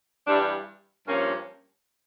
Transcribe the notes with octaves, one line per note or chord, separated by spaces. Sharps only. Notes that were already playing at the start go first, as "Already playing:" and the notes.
G2 E3 G3 D4
G2 F3 A#3 C#4